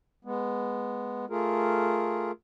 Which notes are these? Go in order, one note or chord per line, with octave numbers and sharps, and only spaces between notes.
G#3 B3
A3 F4 G#4 A#4